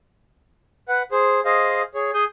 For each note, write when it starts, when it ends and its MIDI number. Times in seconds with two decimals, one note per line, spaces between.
0.89 1.03 71
0.89 1.03 78
1.12 1.41 68
1.12 1.41 72
1.45 1.82 68
1.45 1.82 72
1.45 1.82 75
1.45 1.82 77
1.94 2.11 68
1.94 2.11 73
2.14 2.24 68
2.14 2.24 87
2.14 2.24 91